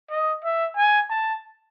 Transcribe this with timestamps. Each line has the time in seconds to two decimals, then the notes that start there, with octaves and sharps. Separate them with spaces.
0.10 D#5
0.44 E5
0.77 G#5
1.10 A5